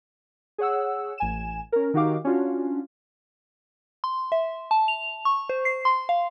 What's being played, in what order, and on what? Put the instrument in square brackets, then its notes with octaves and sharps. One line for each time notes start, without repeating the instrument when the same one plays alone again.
[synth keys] G#4 C#5 F#5 E6
A1 G#5 E7
C#4 A#4
D#3 D#4 F#4 G4 F5 D6
C#4 D4 F4 F#4
[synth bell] C6
E5
A5
F7
C#6
C5
C7
C6
F5